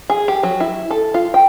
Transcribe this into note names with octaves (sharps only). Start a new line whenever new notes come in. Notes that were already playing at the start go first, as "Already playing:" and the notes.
G#4
G4
F#3
E4
A4
F4
G5